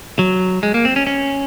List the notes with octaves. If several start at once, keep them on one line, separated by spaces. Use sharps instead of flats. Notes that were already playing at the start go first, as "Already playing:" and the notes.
F#3
G#3
A#3
C4
C#4
C#4